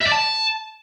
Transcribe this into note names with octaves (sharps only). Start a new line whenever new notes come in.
E5
D5
A5